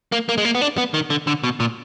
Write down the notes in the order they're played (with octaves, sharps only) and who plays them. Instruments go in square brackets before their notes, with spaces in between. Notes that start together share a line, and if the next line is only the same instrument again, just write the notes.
[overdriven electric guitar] A#3
A#3
G#3
A#3
B3
D4
B3
D#3
D3
D3
B2
A#2